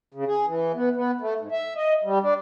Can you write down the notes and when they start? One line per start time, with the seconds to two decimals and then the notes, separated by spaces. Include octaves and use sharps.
0.14 C#3
0.27 G#4
0.46 E3
0.74 B3
0.96 B3
1.21 A3
1.40 G#2
1.52 E5
1.76 D#5
2.04 G3
2.22 D4